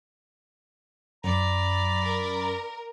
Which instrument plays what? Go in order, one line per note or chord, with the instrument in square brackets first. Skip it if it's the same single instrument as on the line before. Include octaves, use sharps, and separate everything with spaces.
[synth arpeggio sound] F#2 [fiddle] D5 B5 [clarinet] A#5
[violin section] A#4